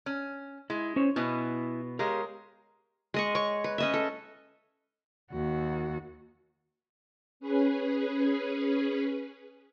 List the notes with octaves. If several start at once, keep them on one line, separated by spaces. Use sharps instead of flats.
C#4
G#3 E4
C#4 C5 C#5
B2 B3 E4 G#5
G#3 G4 A#4 C#5 F5
G#3 D#5 C#6
C#5 C#6
B4
C#4 D#5 E5
A4
D#2 F#4
C#4 G#4 B4